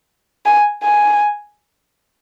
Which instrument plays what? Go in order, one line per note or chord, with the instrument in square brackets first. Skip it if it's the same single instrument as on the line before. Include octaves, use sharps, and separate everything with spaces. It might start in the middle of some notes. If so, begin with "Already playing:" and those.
[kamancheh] G#5
G#5